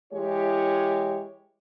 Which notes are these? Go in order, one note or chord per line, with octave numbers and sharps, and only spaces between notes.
E3 G#3 E4 G4 C#5